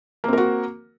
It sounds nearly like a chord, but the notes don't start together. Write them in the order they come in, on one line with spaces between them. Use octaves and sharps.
A#3 C4 A#4 F#4